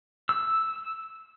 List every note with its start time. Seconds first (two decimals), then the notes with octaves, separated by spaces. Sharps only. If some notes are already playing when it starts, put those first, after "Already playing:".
0.29 E6